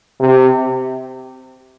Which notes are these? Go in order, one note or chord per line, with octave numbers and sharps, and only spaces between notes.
C3